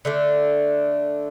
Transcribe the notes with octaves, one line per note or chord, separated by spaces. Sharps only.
D3 A3 D4